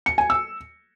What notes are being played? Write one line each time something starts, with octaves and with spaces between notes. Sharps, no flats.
C#7
G#5
E6